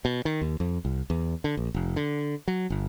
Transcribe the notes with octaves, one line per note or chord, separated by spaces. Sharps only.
B2
D#3
D#2
F2
C2
E2
D3
A#1
F1
D3
F#3
G1